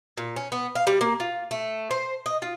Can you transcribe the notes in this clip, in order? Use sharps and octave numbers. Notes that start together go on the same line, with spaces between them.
A#2
C#4
B3
F5
G3
A#3
F4
A3
C5
D#5
F4